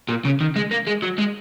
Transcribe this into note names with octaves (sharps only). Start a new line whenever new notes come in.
A#2
C#3
D#3
G#3
A#3
G#3
F#3
G#3